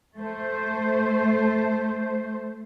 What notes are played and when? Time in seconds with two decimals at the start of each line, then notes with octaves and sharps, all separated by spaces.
0.18 A3 C5